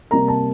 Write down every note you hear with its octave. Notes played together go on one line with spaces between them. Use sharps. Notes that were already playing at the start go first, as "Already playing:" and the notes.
C3 G3 A#3 A#5
A5